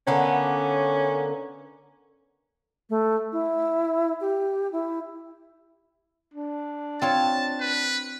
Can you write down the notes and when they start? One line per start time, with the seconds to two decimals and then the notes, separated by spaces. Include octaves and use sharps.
0.07 D3 A#3 B3 C#4
2.90 A3
3.32 E4
4.21 G4
4.72 E4
6.34 D4
7.02 C4 F4 C#5 A5
7.61 B4